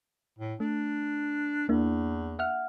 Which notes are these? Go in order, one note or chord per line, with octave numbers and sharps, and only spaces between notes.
A2
A3 D4
E2 A#3 D4 E4
E5 F#5 F6